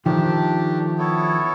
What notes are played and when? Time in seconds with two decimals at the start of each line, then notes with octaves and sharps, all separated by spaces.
0.05 D#3 F3 A3 D4 G4
0.98 B3 E4 A4 C#5